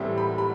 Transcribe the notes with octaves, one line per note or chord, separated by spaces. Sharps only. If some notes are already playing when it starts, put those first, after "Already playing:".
Already playing: A2 E3 G3 C4
B5
B5